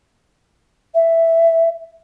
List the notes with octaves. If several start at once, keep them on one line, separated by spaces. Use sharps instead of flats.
E5